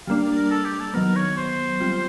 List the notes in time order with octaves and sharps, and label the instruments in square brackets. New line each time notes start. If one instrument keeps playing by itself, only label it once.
[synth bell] G3 A#3 D4 [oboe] F5
[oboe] A#4
A4
G4
A4
[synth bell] D#3 F#3 B3 [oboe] A#4
[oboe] C#5
C5
[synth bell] G3 C4 F4